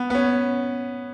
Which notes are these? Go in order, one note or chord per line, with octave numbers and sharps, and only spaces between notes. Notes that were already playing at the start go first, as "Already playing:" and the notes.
Already playing: B3
B3
C#4